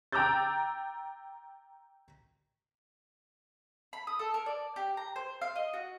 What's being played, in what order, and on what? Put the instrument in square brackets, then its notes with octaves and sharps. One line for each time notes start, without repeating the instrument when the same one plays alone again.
[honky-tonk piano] G5 A#5 D6 E6 G6 A6
[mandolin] B5
D#6
A4
A#4
D5
G4
A#5
C5
F5
D#5
F#4